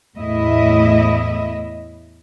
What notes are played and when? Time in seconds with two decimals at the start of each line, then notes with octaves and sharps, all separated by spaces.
0.17 E2 A2 E4 D#5 E5